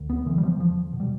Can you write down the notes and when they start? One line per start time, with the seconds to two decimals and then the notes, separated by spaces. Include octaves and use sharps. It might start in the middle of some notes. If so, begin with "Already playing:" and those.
Already playing: D2
0.10 B3
0.26 D3 E3
0.38 G3
0.43 F3
0.59 E2 F3
0.93 B2
1.00 G3